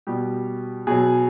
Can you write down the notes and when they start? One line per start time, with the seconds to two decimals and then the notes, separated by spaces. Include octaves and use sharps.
0.07 B2 G3 G4
0.87 B2 F#3 G#4